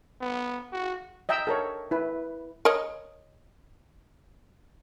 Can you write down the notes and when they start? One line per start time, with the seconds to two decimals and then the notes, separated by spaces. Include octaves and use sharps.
0.21 B3
0.72 F#4
1.29 D#5 E5 G5 A#5 E6
1.47 A4 A#4 C#5
1.91 E4 B4
2.65 A#4 C#5 D#5